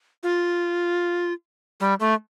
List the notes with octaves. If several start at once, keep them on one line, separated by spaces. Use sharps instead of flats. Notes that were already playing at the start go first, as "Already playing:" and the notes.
F4
G3
A3